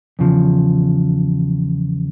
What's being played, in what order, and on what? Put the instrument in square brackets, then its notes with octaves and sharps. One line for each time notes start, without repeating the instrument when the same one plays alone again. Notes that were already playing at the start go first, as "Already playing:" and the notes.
[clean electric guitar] E2 C#3 F3